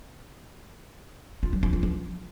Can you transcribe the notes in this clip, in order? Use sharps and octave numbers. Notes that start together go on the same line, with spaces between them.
F4
F#3
F3
F4
F3